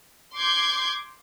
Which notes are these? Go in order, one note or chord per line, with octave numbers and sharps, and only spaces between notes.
C6 D6 G6 G#6